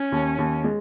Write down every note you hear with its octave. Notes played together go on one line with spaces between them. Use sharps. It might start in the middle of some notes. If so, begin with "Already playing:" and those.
Already playing: C#4
D#2
D#2
G#3